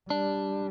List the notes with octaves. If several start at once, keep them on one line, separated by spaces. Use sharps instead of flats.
G3 D4